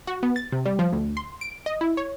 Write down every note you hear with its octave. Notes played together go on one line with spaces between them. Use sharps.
F#4
B3
A6
C3
G3
F3
D2
C6
D7
D#5
E4
C#5